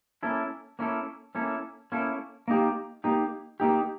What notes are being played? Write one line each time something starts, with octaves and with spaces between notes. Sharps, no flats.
A#3 C#4 E4 A4
A#3 C#4 E4 A4
A#3 C#4 E4 A4
A#3 C#4 E4 A4
A#3 D#4 G4
A#3 D#4 G4
A#3 D#4 G4